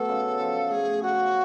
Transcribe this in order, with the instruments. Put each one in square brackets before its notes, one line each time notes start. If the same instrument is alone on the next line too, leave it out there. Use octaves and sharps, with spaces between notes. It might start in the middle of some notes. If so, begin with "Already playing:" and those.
Already playing: [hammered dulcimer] B2 F#3 A3 [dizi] A4
[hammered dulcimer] C#3
F3
[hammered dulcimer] A3 [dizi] G#4
[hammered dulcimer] C#3 [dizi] F#4